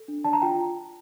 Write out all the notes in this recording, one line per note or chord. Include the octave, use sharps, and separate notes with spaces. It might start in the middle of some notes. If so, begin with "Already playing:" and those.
Already playing: A4
D4
D5 A5
A#5
F4 G5